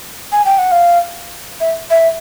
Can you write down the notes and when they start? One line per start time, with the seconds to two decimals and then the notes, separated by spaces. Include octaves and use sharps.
0.32 G#5
0.45 G5
0.58 F#5
0.71 F5
1.60 E5
1.90 E5